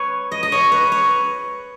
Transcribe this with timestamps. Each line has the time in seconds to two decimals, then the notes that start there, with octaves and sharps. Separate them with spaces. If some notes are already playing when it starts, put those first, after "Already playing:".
Already playing: B4 C#5
0.31 D#5
0.43 D#5
0.52 C#5
0.72 B4
0.92 C#5